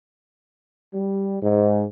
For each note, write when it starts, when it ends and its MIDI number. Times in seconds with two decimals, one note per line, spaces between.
0.94 1.37 55
1.43 1.85 44